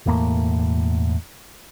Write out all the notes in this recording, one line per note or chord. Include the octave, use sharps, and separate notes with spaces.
E1 E2 A2 A#3